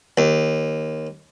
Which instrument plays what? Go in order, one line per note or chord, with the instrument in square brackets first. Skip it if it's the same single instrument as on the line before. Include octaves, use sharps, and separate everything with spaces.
[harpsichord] D#2